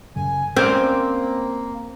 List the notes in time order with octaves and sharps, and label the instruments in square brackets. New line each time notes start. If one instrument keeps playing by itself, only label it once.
[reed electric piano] F#2 C#3 [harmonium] G#5
[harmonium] A#3 [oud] C4 [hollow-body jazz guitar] C#4 A#4 D5 [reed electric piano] G6